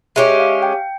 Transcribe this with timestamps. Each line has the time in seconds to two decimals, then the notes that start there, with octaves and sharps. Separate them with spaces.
0.16 G#3 C#4 E4 G4 E5
0.40 F5
0.63 G5